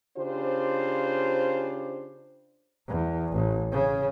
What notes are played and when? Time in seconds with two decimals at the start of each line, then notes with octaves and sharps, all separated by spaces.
0.18 C#3 D4 F4 G4 C5
2.88 E2
3.33 A1
3.72 C#3